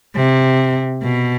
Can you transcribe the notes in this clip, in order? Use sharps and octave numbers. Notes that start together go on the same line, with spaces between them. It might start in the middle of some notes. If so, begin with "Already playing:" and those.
C3
B2